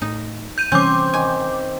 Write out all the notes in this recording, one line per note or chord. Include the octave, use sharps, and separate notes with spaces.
A2 D#4
G6 D#7
C3 E3 G3 C4 C#4 D6 G6
D#3 G#5